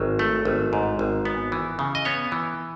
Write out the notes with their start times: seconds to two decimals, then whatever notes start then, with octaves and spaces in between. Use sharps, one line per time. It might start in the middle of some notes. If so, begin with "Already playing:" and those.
Already playing: G#1 F#3
0.19 A3
0.45 G#1
0.73 G#2
0.99 G#1
1.25 B3
1.52 E3
1.79 C#3
1.95 D#5
2.05 B3 C#5
2.32 E3